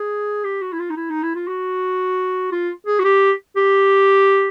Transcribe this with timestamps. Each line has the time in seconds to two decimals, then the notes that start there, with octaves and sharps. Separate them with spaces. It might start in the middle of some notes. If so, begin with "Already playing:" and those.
Already playing: G#4
0.44 G4
0.62 F#4
0.73 E4
0.79 F4
0.90 D#4
0.96 E4
1.10 D#4
1.23 E4
1.35 F4
1.48 F#4
2.52 F4
2.87 G#4
2.99 F#4
3.05 G4
3.56 G4